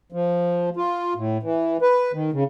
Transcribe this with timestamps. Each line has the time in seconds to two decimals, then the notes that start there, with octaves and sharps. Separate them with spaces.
0.12 F3
0.77 F4
1.16 A2
1.43 E3
1.82 B4
2.13 D#3
2.33 C#3